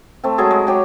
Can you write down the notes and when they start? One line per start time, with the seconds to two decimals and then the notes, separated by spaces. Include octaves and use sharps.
0.24 A3 C4
0.38 F#3 G#3 G#4 A4
0.51 G#3
0.67 F#3 G4 C#5